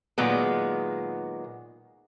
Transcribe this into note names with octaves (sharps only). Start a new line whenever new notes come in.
A#2 D#3 F#3 G#3 B3